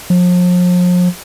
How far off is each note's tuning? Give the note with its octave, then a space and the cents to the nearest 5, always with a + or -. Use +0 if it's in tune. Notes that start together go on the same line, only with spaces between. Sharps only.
F3 +40